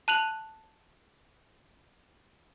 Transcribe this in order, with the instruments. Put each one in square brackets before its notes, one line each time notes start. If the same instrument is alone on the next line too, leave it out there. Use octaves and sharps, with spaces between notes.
[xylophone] A5 F#6 F7 F#7